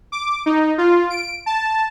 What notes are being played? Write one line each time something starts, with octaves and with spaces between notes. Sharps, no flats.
D6
D#4
F4
D7
A5